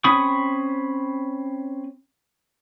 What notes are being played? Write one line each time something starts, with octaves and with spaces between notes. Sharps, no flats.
C4 C#4 B5 C#6 D#6